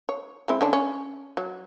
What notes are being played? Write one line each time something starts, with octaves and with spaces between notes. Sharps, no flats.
C#5
G#3 C4 E4
D3 C#4 D4
C#4
F#3